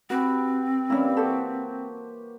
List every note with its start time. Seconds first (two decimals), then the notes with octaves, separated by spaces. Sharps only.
0.10 C4 F#4 G4 B4
0.90 E3 G3 A#3 C#4 E4
1.17 F#4 G4 A4 C5